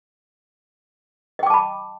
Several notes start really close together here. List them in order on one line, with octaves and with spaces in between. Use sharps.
D#5 G5 D6 A5 B5